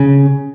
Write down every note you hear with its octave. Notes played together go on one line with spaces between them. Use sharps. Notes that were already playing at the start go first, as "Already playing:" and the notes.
Already playing: C#3